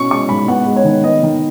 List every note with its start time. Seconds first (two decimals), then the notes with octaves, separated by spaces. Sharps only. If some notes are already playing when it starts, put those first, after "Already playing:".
Already playing: B2 C#4 C#6
0.10 G#3 C#6
0.29 G#2 B5
0.48 B3 F#5
0.66 G#3
0.76 C#5
0.85 D#3
1.04 B3 D#5
1.23 D#3